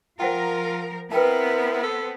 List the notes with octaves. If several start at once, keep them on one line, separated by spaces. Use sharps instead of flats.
F3 F4 A#4 C5 F#5 G5
B3 C4 E4 A#4 B4 G5 A5
A4